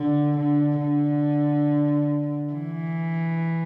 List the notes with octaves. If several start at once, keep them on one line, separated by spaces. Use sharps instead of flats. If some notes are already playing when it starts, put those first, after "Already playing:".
Already playing: D3
D3
D3
E3